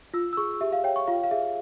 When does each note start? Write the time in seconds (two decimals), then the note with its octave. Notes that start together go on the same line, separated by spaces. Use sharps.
0.14 F4 E6
0.33 E6
0.37 G#4 C#6
0.61 G4 E5
0.73 F5
0.84 C#5 G5
0.96 C#6
1.08 F4 F5
1.24 F5
1.31 G#4 E5